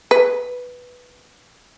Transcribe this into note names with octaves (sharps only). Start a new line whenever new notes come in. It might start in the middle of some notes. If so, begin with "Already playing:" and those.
B4